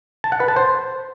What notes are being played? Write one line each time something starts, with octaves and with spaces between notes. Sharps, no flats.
A5
F#5
B4
A5
C5